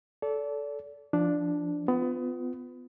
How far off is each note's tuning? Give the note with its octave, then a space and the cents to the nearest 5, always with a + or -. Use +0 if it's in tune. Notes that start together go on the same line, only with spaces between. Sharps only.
A4 -10 D5 -35
F3 -15 D4 +0
B3 +30 F4 +0